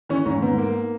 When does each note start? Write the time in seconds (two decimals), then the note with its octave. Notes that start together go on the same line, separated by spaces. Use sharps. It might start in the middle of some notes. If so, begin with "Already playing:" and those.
0.09 E3 C#4
0.26 G#2 C#4
0.42 G#2 B3
0.58 A#3